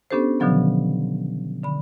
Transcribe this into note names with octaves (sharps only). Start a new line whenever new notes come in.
B3 C#4 D4 G4 A4 C5
B2 D3 D#3 F3 F#3 B3
D3 B5